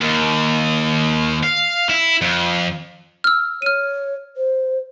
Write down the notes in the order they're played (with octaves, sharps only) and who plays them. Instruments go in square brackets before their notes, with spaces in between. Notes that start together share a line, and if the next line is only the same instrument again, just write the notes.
[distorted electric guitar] D#2
F5
E4
F2
[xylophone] E6 F6
[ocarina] C#5 [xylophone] F6 D#7
[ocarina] C5